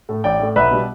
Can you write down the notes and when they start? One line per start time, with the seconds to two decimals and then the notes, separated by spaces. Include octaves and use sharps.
0.09 A2 A3
0.24 A1 D5 G5
0.39 A2 A3
0.56 B1 B4 E5
0.71 B2 G3